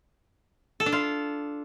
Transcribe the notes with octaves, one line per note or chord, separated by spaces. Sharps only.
A4
D4
F4